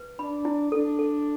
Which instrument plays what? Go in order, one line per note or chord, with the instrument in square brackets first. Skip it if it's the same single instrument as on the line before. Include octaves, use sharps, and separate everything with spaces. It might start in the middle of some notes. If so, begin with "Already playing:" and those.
Already playing: [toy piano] B4
[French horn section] D4 [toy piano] B5
[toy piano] E4
[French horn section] D4 [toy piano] A4
[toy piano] A4